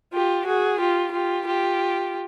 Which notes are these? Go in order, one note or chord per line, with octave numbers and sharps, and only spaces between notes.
F4 G4
F#4 G#4
F4 G4
F4 G4
F4 G4